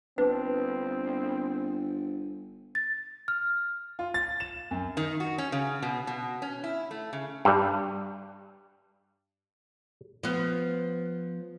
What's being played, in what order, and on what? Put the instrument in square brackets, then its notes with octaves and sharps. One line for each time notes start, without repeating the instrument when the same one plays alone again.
[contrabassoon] G1 [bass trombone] C4 [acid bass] D4 [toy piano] B4
[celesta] A6
F6
[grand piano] F4
A6
E7
F#2
[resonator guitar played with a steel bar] D#3
F#4
C#4
C#3
B2
B2
C#4
E4
A3
C#3
[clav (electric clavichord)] G2 G3
[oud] F3 B3